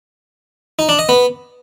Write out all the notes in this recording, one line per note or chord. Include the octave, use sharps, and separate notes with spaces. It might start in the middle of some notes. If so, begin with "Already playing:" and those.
D#4
D4
D#5
B3